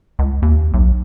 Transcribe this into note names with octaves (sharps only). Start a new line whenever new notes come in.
C#2
D#2
B1